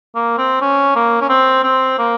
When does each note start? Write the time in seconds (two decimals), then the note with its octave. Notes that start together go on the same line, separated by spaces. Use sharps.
0.15 A#3
0.38 C4
0.61 C#4
0.96 A#3
1.21 C#4
1.29 C4
1.63 C4
1.98 A#3